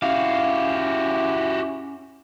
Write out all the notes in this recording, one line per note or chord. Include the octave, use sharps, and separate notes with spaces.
C#4 E4 F#4 G4 F5